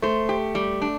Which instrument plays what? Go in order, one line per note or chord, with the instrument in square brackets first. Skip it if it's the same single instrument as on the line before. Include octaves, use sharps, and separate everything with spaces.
[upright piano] A3 [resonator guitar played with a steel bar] C5
[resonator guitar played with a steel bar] G4
G3
D4